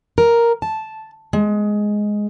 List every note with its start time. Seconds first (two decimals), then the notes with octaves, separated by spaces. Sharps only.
0.18 A#4
0.62 A5
1.33 G#3